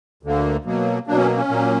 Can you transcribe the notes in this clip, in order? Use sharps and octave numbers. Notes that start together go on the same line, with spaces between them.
D2 D3 A#3
B2 F#3 A#3
B2 F#3 A#3 D4
C#4
C#4
A#2 F#3 A#3